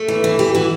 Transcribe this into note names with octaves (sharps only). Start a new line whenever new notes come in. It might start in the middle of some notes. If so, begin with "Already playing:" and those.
Already playing: A3
E3
E3
E3 G4
E3 F#4